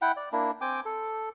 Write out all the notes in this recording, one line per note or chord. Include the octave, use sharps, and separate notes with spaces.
E4 F#5 G5
D5
A#3 D4 E4
C4 G5 G#5 D6
A4